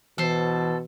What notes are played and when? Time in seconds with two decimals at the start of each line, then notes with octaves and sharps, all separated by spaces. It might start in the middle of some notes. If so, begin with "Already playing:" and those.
0.18 B2 E3 A4 C5